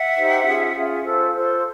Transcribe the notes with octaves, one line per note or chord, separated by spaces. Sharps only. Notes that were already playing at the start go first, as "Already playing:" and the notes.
Already playing: E5 F#5
D#4 G4 C5
C#4 F4 G#4
C#4 F4 G#4
F4 A4 C5
F4 A4 C5